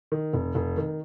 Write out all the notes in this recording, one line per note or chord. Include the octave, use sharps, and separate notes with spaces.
D#3
F1
F1
D#3